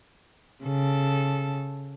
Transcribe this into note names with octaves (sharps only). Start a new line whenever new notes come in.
C#3 A4